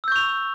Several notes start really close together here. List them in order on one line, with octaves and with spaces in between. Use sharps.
E6 G6 C#6 F7